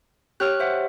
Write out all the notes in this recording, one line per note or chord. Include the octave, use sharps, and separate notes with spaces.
G4 C#5 F6 F#6
C5 E5 F#5